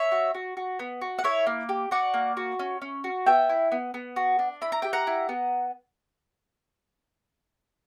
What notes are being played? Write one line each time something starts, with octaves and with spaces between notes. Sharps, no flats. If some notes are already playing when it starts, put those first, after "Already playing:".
Already playing: C#5 E5
F#4
F#4
F#4
B3
F#4
F#5
E4 C#5 E5
A#3
G4
F#4 D5 F#5
A#3
F#4
C#4
C#4
F#4
B3 E5 G5
E4
B3
B3
F#4
D4
E4 B5
A#5
G4 G5
F#5 A#5
E4
B3